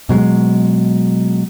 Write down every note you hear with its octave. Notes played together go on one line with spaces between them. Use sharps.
B2 F#3 G#3